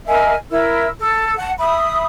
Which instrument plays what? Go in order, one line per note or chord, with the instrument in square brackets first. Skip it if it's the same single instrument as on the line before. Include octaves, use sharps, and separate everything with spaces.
[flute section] A#4 D#5 E5 G#5
E4 A#4 E6
A4
F#5 A5
E5 B5 D#6